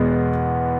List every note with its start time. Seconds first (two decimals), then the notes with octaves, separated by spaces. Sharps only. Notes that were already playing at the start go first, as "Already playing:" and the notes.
Already playing: E2 B2 G#3 B3